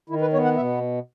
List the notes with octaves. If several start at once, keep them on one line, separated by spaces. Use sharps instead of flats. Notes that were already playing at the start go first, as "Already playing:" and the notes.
D#3 E4
B4
B3 C#5
F#5
B2 E5